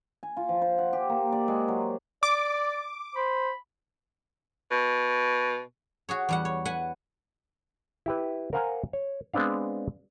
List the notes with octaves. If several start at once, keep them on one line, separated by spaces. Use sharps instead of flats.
G#5
F4
F3
C5
F#5
G4
A#3
D5
G#3
F#3
D5 D6
C5 B5
B2
F#4 G#4 C#5
E2 G3 F#5
C#5
B4 F#5 G#5
E4 G4 B4
A#4 C5 F5 F#5 G#5 A#5
C#5
G#3 B3 C4 D4 F5